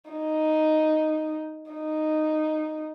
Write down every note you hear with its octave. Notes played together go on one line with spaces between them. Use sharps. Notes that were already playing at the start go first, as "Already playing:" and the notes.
D#4
D#4